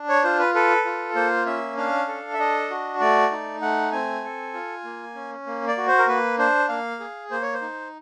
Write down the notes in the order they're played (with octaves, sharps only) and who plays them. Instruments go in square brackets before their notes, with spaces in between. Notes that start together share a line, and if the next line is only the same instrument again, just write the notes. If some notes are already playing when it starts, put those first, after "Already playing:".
Already playing: [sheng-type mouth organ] D4
C#5
F4 C5
B4
A4 B4
F4
A#3 C5
C#4 E5
D4 F5
A4
E5
D4 D#5
F#4
A3 D5
D#4
A3 F#5
C4 G#5
A4
F4
A#3
C#4
A#3
D5
F#4
C5
A#4
A#3 B4
D4 C5
A#3 F5
G#4
A#3 C5
C#5
C5
D#4